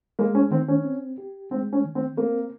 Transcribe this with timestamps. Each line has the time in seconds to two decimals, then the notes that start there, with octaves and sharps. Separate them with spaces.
0.19 G#3 A#3
0.35 C#4
0.51 D#3 C4
0.68 C#4
0.85 C4
1.18 G4
1.51 G#3 C4
1.73 C#4
1.84 D#3
1.95 C4
2.17 A#3 C4